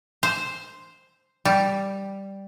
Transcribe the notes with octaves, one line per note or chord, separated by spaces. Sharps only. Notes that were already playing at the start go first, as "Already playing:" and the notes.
C5
G3